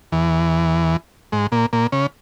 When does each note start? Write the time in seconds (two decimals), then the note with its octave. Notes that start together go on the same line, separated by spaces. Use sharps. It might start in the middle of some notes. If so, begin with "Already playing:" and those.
0.12 E2 E3
1.32 G#2 G#3
1.52 A#2 A#3
1.73 A#2 A#3
1.92 C#3 C#4